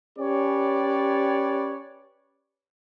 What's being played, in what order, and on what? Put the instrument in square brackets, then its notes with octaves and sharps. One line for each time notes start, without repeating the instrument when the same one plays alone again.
[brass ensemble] C#4 G4 B4 C#5 D5